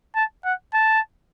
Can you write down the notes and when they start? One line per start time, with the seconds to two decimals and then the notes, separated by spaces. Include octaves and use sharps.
0.16 A5
0.45 F#5
0.74 A5